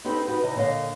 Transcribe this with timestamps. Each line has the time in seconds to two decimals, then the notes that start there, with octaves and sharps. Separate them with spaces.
0.05 B3 C4 D4 D#4 G4 A4
0.28 D#4 F#4 B4
0.42 C3 E3 D#4 D#5
0.56 A#2 D3 C#5 D#5 F5